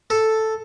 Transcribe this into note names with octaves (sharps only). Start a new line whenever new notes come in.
A4